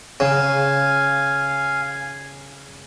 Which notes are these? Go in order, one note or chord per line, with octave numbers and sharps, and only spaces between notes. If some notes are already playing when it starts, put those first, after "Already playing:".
C#3 F5 G#5